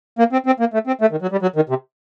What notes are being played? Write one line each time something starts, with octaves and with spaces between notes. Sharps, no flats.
A#3
C4
C4
A#3
A3
C4
A3
D#3
F#3
G3
F#3
D#3
C3